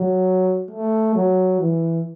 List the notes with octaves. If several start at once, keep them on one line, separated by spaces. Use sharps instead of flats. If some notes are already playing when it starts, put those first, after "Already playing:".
Already playing: F#3
A3
F#3
E3